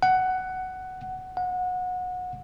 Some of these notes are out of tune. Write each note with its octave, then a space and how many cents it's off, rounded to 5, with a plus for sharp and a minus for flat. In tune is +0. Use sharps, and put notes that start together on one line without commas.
F#5 +10
F#5 -25